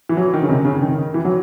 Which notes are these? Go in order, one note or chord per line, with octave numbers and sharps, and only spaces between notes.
E3
F#3
D#3
C#3
C3
C#3
D#3
E3
F#3